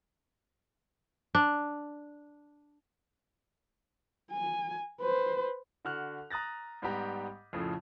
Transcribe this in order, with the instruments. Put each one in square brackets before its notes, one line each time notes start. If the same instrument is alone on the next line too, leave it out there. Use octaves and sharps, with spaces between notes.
[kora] D4
[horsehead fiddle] G#5
B4 C5
[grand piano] D3 F#4 F6 F#6
A#5 D#6 F#6 A6 A#6
G#2 G3 B3 G4 A#5
F2 A2 C#3 F3